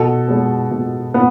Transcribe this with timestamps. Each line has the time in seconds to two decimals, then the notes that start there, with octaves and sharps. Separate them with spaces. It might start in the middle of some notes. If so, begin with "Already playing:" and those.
Already playing: B2 A4
0.28 G#3 B3
0.71 B2
1.14 B3